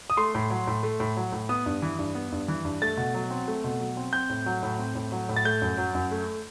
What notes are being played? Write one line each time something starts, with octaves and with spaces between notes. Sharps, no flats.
D#6
A3 C6
A2
F#3
A2
A3
A2
F#3
A2
B3 D#6
G2
E3
G2
B3
G2
E3
G2
A3 A6
B2
F#3
C4
A3
B2
F#3
C4
C4 G6
A2
F#3
A2
C4
A2
F#3
A2
A6
A3 G6
F#2
F#3
F#2
A3